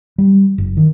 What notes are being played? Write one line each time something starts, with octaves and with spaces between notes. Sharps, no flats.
G3
F#1
D#3